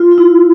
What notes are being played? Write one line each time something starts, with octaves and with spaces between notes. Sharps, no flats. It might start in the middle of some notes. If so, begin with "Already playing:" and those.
Already playing: F4
F4
E4